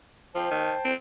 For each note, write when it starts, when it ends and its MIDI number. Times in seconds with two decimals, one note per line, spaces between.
0.35 0.48 53
0.35 0.88 72
0.35 0.88 79
0.35 0.88 81
0.51 0.73 51
0.85 0.94 60